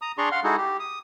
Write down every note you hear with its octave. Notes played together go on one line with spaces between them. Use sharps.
A#5 D#6
D4 G#4 D5 A#5 C6 C#6
F5 F#5 C6 F6
G#3 D#4 E4 F#4 G#4 A4
G4
D#6